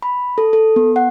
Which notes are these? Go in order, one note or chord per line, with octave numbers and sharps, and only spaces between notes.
B5
A4
A4
B3
F#5